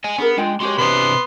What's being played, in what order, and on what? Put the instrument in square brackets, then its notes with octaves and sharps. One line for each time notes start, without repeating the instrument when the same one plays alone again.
[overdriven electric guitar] D#5 G#5
[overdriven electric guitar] B3 [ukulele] D4 G#4 A#4
[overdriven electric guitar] G#3 [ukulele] D4 F4 G5
[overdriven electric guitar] G#3 C6 [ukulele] F#4 G4 C#5
[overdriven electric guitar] C3 D4 [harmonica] B3 C6